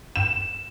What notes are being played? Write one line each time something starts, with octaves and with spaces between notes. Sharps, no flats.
E7